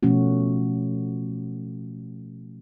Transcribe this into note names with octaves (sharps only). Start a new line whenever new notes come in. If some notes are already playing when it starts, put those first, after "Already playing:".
B2 F3 A3 C#4 F#4